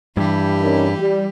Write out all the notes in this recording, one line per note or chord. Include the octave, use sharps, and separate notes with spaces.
G2 E3 G4
C#4 D#4 A#4
G3